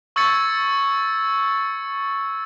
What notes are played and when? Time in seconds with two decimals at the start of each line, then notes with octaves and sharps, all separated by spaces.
0.16 C#6 E6 G#6 A6 C#7